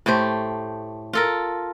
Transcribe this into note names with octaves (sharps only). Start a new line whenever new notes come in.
A2 A3 G4 C5
F4 A4 A#4